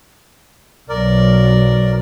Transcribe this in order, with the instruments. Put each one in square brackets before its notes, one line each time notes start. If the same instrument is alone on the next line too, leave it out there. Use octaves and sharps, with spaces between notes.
[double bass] B1 F#3 [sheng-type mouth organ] A#4 D5